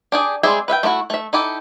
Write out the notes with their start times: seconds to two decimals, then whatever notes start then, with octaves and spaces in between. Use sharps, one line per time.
0.12 D4 G4 G#4
0.43 G3 G#3 C4 G#4 E5
0.68 B4 E5 F5 G5
0.83 A3 B3 E4 F#4
1.10 A3 E5
1.33 D#4 E4 G4 A4